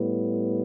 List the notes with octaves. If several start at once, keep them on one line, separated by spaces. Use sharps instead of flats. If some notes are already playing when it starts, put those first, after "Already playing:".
Already playing: A2 G3 B3